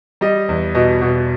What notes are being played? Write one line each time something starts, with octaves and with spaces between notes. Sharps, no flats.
G3 D#5
E2
B2 D#5
B2